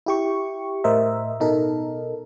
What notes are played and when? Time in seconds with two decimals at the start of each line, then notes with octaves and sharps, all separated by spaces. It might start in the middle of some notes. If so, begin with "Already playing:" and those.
0.06 E4 G4 C#6
0.84 A2 A#4 C5 D#5 E5
1.40 B2 D#4 A4 A#4